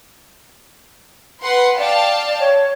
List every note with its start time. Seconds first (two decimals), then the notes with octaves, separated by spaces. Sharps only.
1.42 B4 F#5 C6
1.78 D5 F5 G5 A5
2.39 C#5